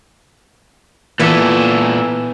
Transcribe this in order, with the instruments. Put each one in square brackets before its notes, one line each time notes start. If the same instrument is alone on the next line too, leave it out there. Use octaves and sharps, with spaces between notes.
[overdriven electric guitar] A#2 A4 [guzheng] E3 B3 E5